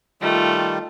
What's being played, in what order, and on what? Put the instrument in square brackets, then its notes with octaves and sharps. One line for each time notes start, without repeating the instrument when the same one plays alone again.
[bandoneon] D#3 G3 [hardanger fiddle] A3 [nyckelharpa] F4